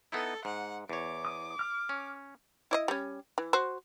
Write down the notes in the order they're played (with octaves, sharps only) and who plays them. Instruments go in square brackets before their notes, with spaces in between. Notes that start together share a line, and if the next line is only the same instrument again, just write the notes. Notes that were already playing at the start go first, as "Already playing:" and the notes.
[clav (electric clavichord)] B3 D#4 E4 [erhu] A4
[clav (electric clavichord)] G#2 [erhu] F#5
[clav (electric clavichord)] E2 C#5 [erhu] D6
[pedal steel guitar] D#6
F6
[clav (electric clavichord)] C#4
[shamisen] E4 D5 D#5
G3 C#4
E3
F#4 C5